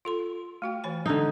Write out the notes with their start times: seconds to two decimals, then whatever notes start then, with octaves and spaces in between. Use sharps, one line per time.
0.05 F4 A4 C6
0.62 A3 F#4 G5
0.84 E3 C#5 G#5
1.06 D3 G#3 D4 D#4 A4